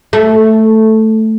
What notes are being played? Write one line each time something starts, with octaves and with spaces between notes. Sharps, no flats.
A3